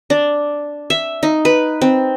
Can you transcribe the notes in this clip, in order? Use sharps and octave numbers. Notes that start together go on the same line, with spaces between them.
D4
E5
D#4
B4
C4